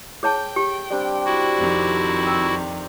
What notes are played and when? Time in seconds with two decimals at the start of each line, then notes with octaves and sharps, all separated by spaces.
0.23 G#4 C#5 G5 A5
0.56 G4
0.90 G3 C4 D4
1.25 E4 F#4
1.57 F2 C3 D#3
2.26 A#4 G5